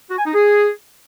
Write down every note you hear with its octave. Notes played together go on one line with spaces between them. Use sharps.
F#4
G#5
D#4
G#4